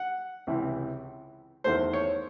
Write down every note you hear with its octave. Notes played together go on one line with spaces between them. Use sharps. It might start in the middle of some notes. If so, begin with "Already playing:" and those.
Already playing: F#5
C#2 C3 E3
E2 D#3 A3 C5
C#5